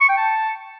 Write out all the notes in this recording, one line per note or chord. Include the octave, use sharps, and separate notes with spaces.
C#6
G5
A5